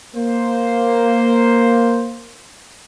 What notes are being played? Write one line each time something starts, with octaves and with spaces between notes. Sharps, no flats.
A#3 C5